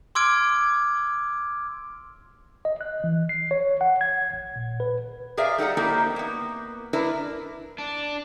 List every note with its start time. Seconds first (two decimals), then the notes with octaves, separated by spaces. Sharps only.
0.15 C6 D6 E6 F6 G#6 D7
2.65 D#5
2.81 F#6
3.04 E3
3.29 C7
3.51 C#5
3.81 F#5
4.01 G#6
4.33 A1
4.56 A#2
4.80 B4
5.37 G#4 A#4 D5 E5 F5
5.58 G3 D#4 A4 F#5 A#5
5.77 A#3 C4 D#4 E4 G4 A#4
6.16 A#3 B3
6.93 D4 E4 A#4 B4
7.78 D4